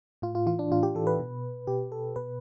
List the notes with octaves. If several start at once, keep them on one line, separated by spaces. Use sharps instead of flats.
A2 F4
F4
E3 F4
D4
A2 F4
G4
E3 A4
B4
B2
B2 G4
A4
B2 B4